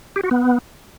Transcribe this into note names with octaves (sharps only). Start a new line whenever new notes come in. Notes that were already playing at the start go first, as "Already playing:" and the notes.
G4
F#4
B3